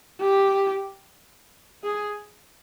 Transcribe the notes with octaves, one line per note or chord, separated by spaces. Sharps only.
G4
G#4